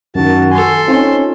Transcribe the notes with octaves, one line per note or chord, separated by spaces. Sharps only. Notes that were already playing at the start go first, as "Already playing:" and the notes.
F#2 D#3 F#4 A5
A4 G#5 C6
C4 C#4 D#4 F4